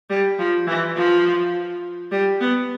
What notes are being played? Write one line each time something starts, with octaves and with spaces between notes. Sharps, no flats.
G3
F3
E3
F3
G3
B3